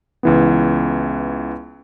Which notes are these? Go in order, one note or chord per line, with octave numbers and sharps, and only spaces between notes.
C#2 E3 B3